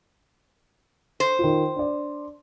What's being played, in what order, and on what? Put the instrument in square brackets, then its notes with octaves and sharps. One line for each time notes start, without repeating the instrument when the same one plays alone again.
[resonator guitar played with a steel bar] C5
[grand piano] D#3 F4
D4 D5